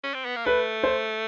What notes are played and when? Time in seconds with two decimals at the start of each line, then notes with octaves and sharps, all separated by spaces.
0.04 C#4
0.14 C4
0.25 B3
0.36 A#3
0.46 A3 B4
0.83 C5